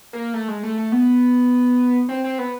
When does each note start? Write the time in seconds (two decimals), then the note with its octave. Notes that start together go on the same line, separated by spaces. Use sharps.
0.13 A#3
0.34 A3
0.48 G#3
0.63 A3
0.78 A3
0.92 B3
2.09 C4
2.24 C4
2.38 B3